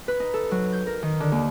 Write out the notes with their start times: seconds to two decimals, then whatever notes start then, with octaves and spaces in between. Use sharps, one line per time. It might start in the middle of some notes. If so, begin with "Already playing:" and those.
0.08 B4
0.20 D#4
0.34 A4
0.51 F#3
0.73 G6
0.87 A#4
1.03 D#3
1.20 D3
1.32 D#2